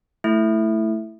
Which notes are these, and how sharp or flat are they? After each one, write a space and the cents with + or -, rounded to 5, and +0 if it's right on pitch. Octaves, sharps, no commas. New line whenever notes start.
A3 +0 E4 +0